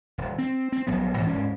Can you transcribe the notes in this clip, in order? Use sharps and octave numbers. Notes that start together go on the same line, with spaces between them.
D#1
C4
C4
D#1 A#1 F#3 B3
G#2 B2 E3
D#1 G#2 C#4